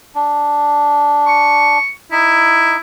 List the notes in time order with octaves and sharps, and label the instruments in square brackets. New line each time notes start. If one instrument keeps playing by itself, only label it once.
[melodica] D4
[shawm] C#6
[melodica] D#4 [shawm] E4